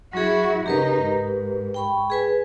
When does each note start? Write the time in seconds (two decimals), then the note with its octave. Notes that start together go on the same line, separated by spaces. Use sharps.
0.13 F#3 E4 F#4 G#4
0.66 C#3 D#4 G4 A#4 B4
1.02 G#2
1.74 G5 B5 C#6
2.10 G#4 B4 G#5